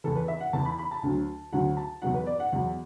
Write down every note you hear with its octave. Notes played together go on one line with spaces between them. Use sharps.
E2 E3 A4
B4
E5
F#5
E2 E3 A5
B5
B5
A5
D2 D3 F#3
D2 D3 F#3 F#5
A5
E2 B2 F#3 F#5
B4
D5
F#5
E2 B2 F#3 F#5